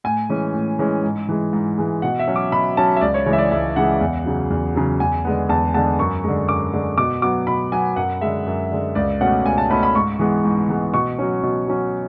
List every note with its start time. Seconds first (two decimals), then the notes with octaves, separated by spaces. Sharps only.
0.04 A2 G#5
0.29 E3 G#3 C#4
0.54 A2
0.79 E3 G#3 C#4
1.03 G#2
1.28 E3 G#3
1.53 G#2
1.78 E3 G#3
2.02 B2 F#5
2.19 E5
2.28 F#3 C#4
2.36 D6
2.52 B2 B5
2.77 F#3 C#4 A5
2.96 E5
3.01 C#2 D5
3.14 C#5
3.26 C#3 E3 G#3 C#5
3.33 E5
3.38 D5
3.51 C#2 E5
3.76 C#3 E3 G#3 F#5
4.01 E2
4.25 C#3 F#3
4.50 E2
4.75 C#3 F#3
5.00 E2 G#5
5.25 D3 G#3 B3
5.49 E2 A5
5.74 D3 G#3 B3 A5
5.99 F#2 C#6
6.24 D3 G#3
6.48 F#2 D6
6.73 D3 G#3
6.98 B2 D6
7.22 F#3 B3 D6
7.47 B2 B5
7.72 F#3 B3 G#5
7.96 F#2 F#5
8.21 D3 G#3 E5
8.46 F#2
8.71 D3 G#3
8.95 C#2 D5
9.21 B2 A3 C#4 F#5
9.45 C#2 G#5
9.58 A5
9.70 B2 A3 C#4 B5
9.83 B5
9.95 G#2 C#6
10.19 E3 G#3 B3
10.44 G#2
10.69 E3 G#3 B3
10.94 B2 C#6
11.19 F#3 C#4
11.43 B2
11.68 F#3 C#4